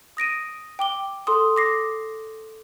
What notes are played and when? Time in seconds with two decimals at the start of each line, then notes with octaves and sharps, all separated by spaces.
0.17 D#6 A#6 D7 D#7
0.79 G5 D6 G7
1.27 A4 C6 D#6
1.57 D6 A#6 C7